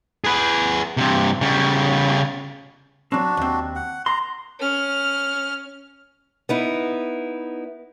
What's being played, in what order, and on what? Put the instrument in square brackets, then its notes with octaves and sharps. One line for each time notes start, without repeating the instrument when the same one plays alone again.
[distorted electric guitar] G#4 B4
G2 C3
C#3 G3
[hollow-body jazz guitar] F#3 C4 [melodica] D4 F#4
[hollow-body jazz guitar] D#2 C4
[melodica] F#5
[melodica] A#5 [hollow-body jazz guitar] C6
[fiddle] C#4 F6
[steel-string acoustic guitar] B3 D#4 E4